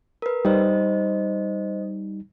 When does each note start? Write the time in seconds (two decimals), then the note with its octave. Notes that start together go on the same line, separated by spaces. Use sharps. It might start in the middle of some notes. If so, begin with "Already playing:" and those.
0.22 A#4 B4
0.45 G3 D#4 C5 D#5 D#6